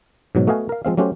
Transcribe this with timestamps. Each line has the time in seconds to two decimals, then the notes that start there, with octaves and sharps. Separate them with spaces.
0.35 G#2 B2 F#3
0.47 A3 B3 F#4 D#5 F5 G#5
0.69 A#4 F5
0.85 F3 G#3 C4 F5
0.97 F#3 A3 C#4 F#4 G4 C5